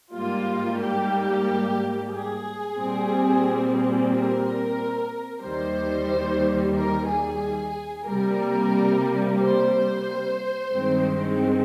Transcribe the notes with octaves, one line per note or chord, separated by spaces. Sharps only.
G#2 G3 A#3 F4
G4
G#4
A#2 G3 C4
A#4
D#2 D#3 G3 C5
A#4
G#4
C3 G3 A#3 A#4
C5
G2 D#3 G#3 C4